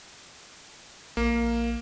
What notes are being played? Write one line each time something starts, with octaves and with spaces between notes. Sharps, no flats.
A#1 A#3